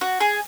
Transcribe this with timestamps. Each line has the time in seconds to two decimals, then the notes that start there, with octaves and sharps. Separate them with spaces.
0.01 F#4
0.20 G#4